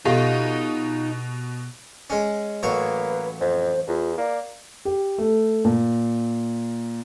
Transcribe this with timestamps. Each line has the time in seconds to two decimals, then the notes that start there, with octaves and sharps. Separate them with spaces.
0.05 B2 D#4 F4 G4 A4 E5
2.10 G#3 C#4
2.63 A1 F#3 A#3 B4 C#5
3.40 F2 C5
3.88 E2 F4
4.18 A#3 D5
4.85 G4
5.18 A3
5.65 A#2